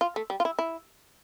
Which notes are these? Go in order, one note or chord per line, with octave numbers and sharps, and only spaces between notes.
F4
A3
G3
F4
E4
E4